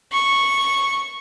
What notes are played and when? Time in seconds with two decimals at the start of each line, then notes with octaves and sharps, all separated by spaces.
0.13 C#6